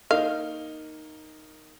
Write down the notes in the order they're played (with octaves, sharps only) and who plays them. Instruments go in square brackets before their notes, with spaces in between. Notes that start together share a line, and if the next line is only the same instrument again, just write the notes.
[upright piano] A#3 D#4 [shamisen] F5